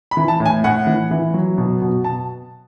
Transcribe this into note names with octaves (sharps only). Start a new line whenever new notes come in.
B5
E3
A5
A2
G#5
A2 F#5
E3
E3
F#3
B2
B2
B2 A5